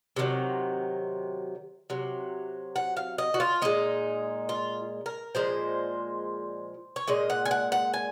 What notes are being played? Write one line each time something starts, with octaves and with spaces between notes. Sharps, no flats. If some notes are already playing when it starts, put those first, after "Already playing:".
C3 D#3 F#3
C3 F#3
F#5
F5
D#5
F#4
F4
A#2 G#3 D#4
F4
A#4
A#2 F3 G#3 C5
C#5
A#2 G#3 D#5
F#5
G#5
F#5
F#5
G#5